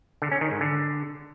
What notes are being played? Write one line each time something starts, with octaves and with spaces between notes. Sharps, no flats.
D3
C#4
D#3
G#2
D3